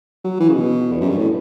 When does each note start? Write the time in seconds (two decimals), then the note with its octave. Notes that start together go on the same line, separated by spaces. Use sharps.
0.24 F#3
0.40 E3
0.49 C#3
0.55 B2
0.92 E2
1.01 F#2
1.09 G2
1.18 A2